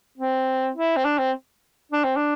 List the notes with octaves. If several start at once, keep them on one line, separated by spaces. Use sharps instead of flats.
C4
E4
C4
D4
C4
D4
C4
D4